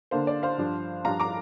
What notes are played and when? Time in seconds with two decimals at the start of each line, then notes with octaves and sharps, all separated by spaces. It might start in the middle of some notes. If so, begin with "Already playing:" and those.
0.11 D3 A#3 D4 C5 F5
0.27 D5
0.43 C5 F5
0.58 G2 F3 D4
1.05 G2 F3 D4 F5 A#5
1.20 A#5 D6